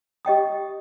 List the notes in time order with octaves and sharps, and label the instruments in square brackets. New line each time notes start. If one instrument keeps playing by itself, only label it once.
[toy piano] G4 D#5 G5 D#6